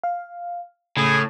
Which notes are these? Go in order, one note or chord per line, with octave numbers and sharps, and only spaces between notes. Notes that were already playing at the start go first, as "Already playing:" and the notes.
F5
A2 C#3 G#4